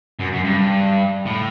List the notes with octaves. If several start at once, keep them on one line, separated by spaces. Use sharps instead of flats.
F#2
F#2
G2
A2